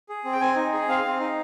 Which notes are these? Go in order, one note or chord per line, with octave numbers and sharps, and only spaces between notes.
G#4
C4
G5
C4 G#5
D#4
G#4
C4 F5
C4
D#4